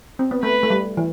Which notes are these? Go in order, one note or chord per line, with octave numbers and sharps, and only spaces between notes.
C4
B3
A3 B4
A3
G3
E3